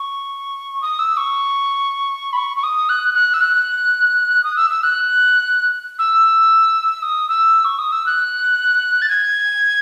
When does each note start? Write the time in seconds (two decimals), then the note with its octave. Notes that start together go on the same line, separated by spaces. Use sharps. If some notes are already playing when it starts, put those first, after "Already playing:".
Already playing: C#6
0.82 D#6
0.99 E6
1.17 C#6
2.33 B5
2.37 C#6
2.57 C#6
2.63 D#6
2.89 F#6
3.14 F#6
3.34 E6
3.41 F#6
4.44 D#6
4.56 E6
4.70 E6
4.83 F#6
5.99 E6
7.02 D#6
7.29 E6
7.65 C#6
7.79 D#6
7.92 E6
8.06 F#6
9.02 A6
9.09 G#6